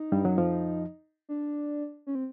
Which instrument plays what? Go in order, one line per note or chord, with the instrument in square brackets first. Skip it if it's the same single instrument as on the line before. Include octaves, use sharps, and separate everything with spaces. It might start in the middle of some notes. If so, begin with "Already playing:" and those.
Already playing: [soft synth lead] D#4
[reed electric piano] G2 G3
F#2 F#3
F2 F3
[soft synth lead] D4
C#4
C4